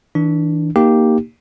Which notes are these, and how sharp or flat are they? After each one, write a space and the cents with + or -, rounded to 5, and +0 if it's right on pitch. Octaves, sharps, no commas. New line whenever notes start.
E3 -35 D4 +0
A#3 +0 D#4 +0 G4 +0